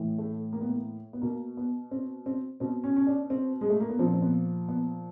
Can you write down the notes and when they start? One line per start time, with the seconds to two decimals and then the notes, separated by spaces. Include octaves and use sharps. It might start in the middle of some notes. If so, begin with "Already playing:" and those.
Already playing: A2 E3
0.18 A3
0.53 A#3
0.61 B3
0.70 A#3
1.13 B3
1.22 B2 A#3
1.57 B3
1.91 C4
2.26 C4
2.60 B2 C4
2.84 C#4
2.96 C#4
3.07 D4
3.30 C4
3.61 G#3
3.70 A3
3.80 A#3
3.90 B3
3.99 A#2 F3 C4
4.14 C4
4.22 B3
4.69 B3